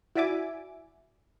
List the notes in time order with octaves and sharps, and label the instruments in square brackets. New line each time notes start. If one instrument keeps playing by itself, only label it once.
[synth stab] E4 F#4 D5 E5 G#5 D6